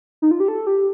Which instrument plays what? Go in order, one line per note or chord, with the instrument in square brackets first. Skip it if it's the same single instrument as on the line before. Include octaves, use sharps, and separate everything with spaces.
[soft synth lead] D#4
F4
G4
A4
G4